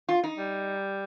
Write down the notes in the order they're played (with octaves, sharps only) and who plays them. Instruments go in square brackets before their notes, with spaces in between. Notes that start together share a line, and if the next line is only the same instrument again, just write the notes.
[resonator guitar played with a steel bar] F4
D#4
[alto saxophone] G3